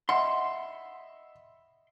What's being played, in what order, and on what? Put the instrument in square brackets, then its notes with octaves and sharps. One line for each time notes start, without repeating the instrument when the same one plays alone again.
[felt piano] D#5 E5 B5 [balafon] F#5 [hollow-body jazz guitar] C6